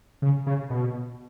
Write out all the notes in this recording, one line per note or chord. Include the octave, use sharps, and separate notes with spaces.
C#3
C#3
B2